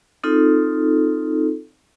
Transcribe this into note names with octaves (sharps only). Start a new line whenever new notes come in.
C4 D#4 F4 A4